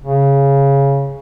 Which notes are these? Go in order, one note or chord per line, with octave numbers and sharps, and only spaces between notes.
C#3